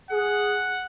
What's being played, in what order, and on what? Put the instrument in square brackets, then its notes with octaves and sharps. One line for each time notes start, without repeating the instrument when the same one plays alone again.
[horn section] G#4 [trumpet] F#5